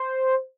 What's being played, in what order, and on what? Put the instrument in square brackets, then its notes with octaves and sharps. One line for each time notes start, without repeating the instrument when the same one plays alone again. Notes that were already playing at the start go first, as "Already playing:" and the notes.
Already playing: [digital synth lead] C5